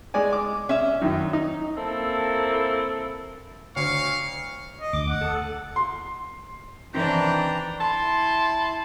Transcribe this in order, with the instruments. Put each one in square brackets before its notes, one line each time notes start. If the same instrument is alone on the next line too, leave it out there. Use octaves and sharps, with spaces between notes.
[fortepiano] G#3 D5 G#5
D6
[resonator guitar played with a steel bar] C#4 E5
[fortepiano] F#2 D#3
D#4
[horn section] A#3 C4 E4 A4
[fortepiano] D2 C#5 [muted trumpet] F5 [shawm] C#6
[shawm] D#5
[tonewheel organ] D2 D6
[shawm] F#5
[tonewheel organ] A4
[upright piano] C6
[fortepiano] C3 D#3 C4 [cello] E3 D4 [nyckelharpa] G5 A#5
[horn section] E4 A5 C6